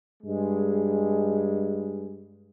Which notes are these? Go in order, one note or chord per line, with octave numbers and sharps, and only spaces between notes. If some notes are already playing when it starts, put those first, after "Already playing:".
G2 G#3